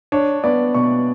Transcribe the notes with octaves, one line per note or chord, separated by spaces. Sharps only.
D4 C#5
B3 D5
B2 C#6